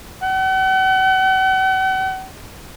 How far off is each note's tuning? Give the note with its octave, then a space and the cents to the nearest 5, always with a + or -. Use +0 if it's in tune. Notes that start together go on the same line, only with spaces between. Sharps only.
F#5 +40